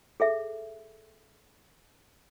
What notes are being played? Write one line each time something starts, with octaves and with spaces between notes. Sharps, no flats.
G#4 A4 E5